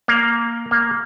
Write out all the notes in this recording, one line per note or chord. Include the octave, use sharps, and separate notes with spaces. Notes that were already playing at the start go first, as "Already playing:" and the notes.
A#3
A#3